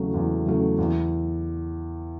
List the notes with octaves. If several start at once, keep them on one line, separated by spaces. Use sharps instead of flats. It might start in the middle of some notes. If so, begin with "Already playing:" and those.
Already playing: E2 C#3 F#3 A3
E2
C#3 F#3 A3
E2